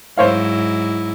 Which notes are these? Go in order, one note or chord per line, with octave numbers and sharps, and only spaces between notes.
G#2 F#3 E4 C5 C#5 F5